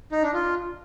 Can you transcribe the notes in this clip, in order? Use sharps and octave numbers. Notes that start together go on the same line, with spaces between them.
D#4
D4
F4